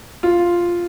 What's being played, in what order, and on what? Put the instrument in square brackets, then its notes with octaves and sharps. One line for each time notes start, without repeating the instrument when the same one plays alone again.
[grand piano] F4